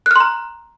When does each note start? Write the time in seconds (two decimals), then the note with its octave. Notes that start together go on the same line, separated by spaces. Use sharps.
0.06 F#6
0.11 F6
0.16 C6
0.20 A#5